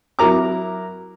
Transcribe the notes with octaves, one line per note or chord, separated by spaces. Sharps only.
F#3 E4 A#4 A#5 D6